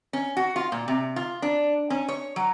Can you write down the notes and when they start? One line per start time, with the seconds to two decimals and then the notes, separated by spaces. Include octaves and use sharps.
0.13 C#4
0.37 F#4
0.56 F4
0.72 A#2
0.88 C3
1.16 F4
1.42 D4
1.90 C#4
2.08 C#5
2.36 F#3